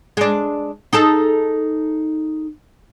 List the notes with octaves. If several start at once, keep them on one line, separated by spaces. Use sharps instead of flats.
G#3 D4
D#4 G#4 A4